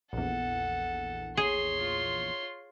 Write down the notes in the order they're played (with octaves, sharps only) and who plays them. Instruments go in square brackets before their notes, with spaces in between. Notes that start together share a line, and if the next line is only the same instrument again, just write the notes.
[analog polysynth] A#1 E2 [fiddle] A4 [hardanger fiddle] F#5
[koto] G#4 [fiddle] C#5 C6
[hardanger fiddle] F4